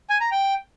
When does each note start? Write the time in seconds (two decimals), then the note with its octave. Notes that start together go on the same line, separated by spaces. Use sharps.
0.10 G#5
0.21 A#5
0.31 G5